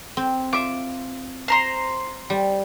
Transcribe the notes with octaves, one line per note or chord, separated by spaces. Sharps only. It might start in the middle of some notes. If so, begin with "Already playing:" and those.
C4
F4 E5 D6
C5 A#5 C6
G3